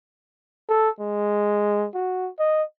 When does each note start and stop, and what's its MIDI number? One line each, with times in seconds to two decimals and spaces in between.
0.69 0.89 69
1.00 1.86 56
1.94 2.29 66
2.39 2.63 75